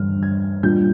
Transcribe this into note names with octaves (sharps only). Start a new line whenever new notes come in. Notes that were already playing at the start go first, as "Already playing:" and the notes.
Already playing: G2 D3 G3 D4 F6
G#6
A#2 G3 A#3 D4 F4 G6